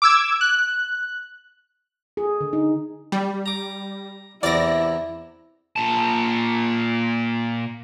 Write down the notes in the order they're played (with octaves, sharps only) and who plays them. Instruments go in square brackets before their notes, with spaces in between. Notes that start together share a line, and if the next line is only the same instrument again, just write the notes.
[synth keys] D6 E6 G#6
F#6
[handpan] G#4
D3
D#4
[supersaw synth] G3
[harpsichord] A#5 D6
[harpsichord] E2 C3 [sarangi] E4 [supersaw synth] D5 A#6
[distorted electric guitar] A#2 A5